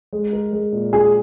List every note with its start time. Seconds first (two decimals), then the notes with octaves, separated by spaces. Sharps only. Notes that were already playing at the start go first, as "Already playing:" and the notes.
0.13 G#3
0.33 A#4
0.53 G#3
0.73 A#2
0.93 F#4 G#4